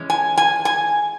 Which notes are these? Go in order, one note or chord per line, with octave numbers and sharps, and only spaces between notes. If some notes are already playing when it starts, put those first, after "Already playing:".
Already playing: E3 G#3 C#4
G#5
G#5
G#5